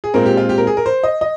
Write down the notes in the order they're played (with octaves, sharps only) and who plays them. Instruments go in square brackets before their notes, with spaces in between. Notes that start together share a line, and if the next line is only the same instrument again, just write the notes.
[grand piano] G#4
A#2 G#3 C4 A#4
G4
F4
G4
A#4
G#4
A#4
C5
D#5
D#5